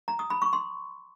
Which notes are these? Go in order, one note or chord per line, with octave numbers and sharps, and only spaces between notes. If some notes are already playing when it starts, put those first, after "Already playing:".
A#5
D#6
B5
C#6
C6